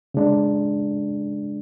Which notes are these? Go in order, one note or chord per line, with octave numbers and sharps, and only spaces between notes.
C#3 G#3 D4